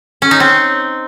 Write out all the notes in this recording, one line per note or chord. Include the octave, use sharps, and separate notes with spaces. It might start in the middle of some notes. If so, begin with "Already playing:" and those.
C#4
D#4
C4